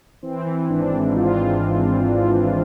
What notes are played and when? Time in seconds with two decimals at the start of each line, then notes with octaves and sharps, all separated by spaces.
0.23 E3 C4
0.47 E3
0.69 G#1 D4
0.92 G#2
1.16 G#2 F4